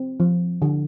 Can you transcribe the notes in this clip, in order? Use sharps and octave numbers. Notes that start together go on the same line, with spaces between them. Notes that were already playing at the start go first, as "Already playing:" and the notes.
Already playing: C4
F3
D3